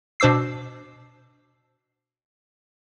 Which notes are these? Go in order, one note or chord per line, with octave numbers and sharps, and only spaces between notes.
B2 D4 C5 D6 E6 C7